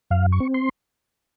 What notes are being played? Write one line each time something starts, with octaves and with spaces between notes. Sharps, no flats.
F#2 F5
C#6
C4
C6